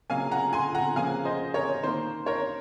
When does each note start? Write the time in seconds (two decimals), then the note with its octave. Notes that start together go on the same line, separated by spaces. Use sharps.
0.10 C#3 F#3 A#3 F5 G#5
0.31 F#5 A#5
0.53 G#5 C6
0.75 F#5 A#5
0.96 C#3 F3 A#3 F5 G#5
1.25 C5 D#5
1.54 A#4 C#5
1.83 D#3 A#3 C5
2.26 A#4 C#5